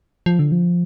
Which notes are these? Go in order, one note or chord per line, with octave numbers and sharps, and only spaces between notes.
F3
D3
F3